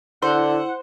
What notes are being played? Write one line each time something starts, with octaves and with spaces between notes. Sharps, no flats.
D3 E4 C5 F#5